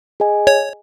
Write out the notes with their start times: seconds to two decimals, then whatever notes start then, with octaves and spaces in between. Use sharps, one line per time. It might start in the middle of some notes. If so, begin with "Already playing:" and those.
0.20 G#4 D#5 G#5
0.47 C#5